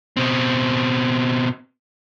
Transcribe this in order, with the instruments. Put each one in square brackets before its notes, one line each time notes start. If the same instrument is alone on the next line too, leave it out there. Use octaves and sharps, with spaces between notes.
[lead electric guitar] B2 C4